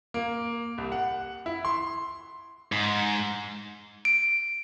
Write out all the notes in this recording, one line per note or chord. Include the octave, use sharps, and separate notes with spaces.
A#3
C2
F#5
E4
C6
G#2
D7